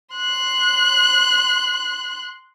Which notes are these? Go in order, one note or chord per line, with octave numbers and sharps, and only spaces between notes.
C6 F#6